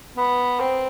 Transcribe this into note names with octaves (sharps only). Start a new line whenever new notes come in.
B3
C4